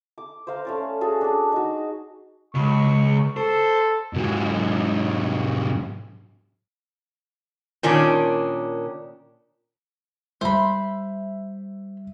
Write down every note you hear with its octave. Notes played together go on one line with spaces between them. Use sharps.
D6
C5 F5 A#5
A3 C#4 D5
F#4 G#4 A4
D4 G#4
D#4 F#4
C#2 C#6
A4 C5
G#2 F#3
A#2 D#3 C#4 D4
G3 C5 E5 B5